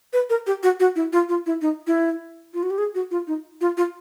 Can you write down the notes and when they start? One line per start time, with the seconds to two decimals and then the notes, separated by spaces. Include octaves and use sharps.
0.13 B4
0.30 A#4
0.47 G4
0.63 F#4
0.80 F#4
0.96 E4
1.13 F4
1.29 F4
1.46 E4
1.62 D#4
1.87 E4
2.54 F4
2.63 F#4
2.70 G4
2.78 G#4
2.95 F#4
3.11 F4
3.27 D#4
3.61 F4
3.77 F4